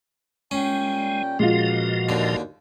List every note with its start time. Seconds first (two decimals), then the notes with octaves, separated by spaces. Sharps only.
0.51 A#2 G3 G#3 C#4 G5
1.39 A#2 F3 G#3 A#3 B3 F4 F#4 D#5
2.09 D#2 D3